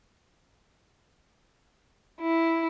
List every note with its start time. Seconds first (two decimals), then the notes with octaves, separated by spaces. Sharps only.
2.21 E4